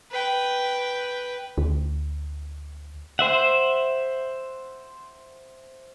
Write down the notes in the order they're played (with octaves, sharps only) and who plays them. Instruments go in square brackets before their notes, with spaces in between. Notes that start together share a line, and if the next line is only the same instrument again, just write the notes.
[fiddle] B4 G5
[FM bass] D2
[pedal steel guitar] C5 E5 F#5